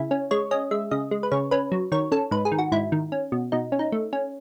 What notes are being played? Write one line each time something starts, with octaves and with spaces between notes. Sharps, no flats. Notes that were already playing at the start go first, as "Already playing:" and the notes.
Already playing: C#3 E4
C#4
G#3 C#5
C#4 D#5
G#3 E5
C#3 D#5
G#3
B4
C#3 C#5
C#4 B4
F#3
D#3 C#5
C#4 A4
G#2 B4
G#4
D#3
F#4
G#2 E4
D#3
C#4
B2
B2 D#4
C#4
D#4
A3
C#4